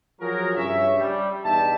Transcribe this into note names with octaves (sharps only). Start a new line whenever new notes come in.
F3 F#3 F4 F#4 G#4 A#4
G2 C#3 C#4 C#5 E5
G3
E2 G2 D#4 G4 E5 A5